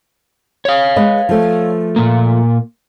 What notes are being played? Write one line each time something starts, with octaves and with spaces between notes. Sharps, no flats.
C#5 F5
G#3 B4 D#5
F3 A3
A#2 A#3